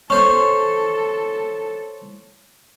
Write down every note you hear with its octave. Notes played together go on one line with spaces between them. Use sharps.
C#4 A4 C5 C#6